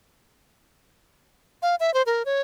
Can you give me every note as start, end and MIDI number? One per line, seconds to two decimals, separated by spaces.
1.62 1.75 77
1.80 1.93 76
1.94 2.02 72
2.06 2.23 70
2.26 2.41 73